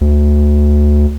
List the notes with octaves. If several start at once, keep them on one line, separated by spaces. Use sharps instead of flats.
D2